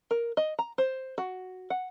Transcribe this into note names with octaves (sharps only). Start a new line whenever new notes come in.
A#4
D#5
A#5
C5
F#4
F#5